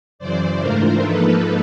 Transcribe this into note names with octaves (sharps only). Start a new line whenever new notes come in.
F#2 C#3 E3 C5 D5
G#2 E3 A3 D4 F4 A#4 C5
G#2 F3 A#3 D#4 A4 B4